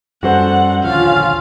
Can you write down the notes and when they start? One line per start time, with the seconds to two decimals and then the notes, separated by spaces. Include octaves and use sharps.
0.23 F#2 G3 C#4 F#4 A4 C5 F#5
0.83 A#1 D#2 D3 C#4 F4 F5